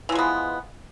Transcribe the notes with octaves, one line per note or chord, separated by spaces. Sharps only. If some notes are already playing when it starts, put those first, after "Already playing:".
E3 F3 G#3 B3